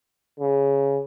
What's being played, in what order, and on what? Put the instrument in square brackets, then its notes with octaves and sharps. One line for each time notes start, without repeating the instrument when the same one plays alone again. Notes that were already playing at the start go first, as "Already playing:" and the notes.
[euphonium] C#3